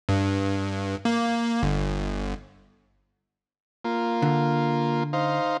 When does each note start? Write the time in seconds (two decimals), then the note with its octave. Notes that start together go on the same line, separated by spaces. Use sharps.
0.09 G2
1.05 A#3
1.63 G1
3.85 A#3 F4
4.22 D3
5.13 D#4 C5 F5